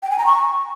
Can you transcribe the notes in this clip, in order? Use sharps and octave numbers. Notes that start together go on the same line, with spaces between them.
G5
G#5
A#5
C#6